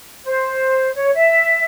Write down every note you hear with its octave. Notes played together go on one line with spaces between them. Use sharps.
C5
C#5
E5